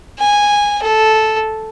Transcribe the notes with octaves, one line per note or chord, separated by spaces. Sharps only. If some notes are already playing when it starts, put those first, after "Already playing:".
G#5
A4